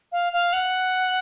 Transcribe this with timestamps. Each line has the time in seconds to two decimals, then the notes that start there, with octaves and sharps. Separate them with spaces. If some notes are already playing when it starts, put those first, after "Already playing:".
0.12 F5
0.33 F5
0.53 F#5